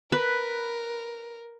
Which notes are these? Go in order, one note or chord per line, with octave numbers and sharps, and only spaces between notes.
A#4 B4